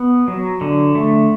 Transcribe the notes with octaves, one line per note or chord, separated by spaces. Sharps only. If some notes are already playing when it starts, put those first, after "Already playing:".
Already playing: B3
F#3
D3
A3